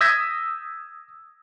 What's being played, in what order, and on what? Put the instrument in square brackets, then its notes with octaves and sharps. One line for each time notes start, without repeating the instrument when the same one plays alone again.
[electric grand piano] D#6 E6 G6 G#6 A#6 B6